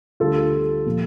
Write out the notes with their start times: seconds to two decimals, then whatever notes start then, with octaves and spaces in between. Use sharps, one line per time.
0.20 D2 D3 G3 F4 A4
0.86 A#2 F3